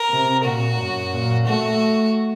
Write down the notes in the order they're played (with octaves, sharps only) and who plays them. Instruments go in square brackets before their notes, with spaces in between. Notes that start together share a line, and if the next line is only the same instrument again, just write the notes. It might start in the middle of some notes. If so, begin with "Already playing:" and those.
Already playing: [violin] A#4
[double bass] C3
[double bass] A#2 [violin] F#4
[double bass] F#2
A#2
[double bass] A3 [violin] F#4